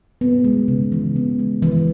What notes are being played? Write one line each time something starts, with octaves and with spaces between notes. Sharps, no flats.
B3
G#3
C#3
E3
B3
G#3
E3